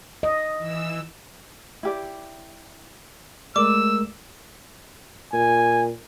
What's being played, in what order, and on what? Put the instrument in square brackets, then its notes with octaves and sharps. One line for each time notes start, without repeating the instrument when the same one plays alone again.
[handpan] D#5
[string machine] E3 E6
[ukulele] E4 G4 D5
[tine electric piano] G#3 A3 A#4 [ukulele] D5 [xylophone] D6 [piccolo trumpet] E6
[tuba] A#2 [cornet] G#5